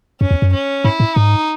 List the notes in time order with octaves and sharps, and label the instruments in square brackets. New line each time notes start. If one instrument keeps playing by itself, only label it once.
[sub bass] F#2 [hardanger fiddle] C#4
[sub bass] E2
F#2
[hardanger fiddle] C#4
[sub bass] G#2 [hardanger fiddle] E4
[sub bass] A2
[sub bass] G#2 [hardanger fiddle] D#4